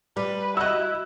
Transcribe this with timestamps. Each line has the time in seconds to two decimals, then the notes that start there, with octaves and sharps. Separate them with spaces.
0.17 G3 B4
0.57 E4 F#4 D#5 E6 F#6